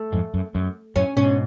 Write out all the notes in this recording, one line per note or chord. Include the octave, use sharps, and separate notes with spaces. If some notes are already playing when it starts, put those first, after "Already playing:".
Already playing: A3
F2 G#2
F#2
F#2
F#2 A2 C#4
G#2 B2 C#4